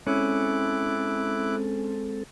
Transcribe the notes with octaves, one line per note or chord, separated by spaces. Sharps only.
G#3 C4 C#4 E4 A4 D6 F#6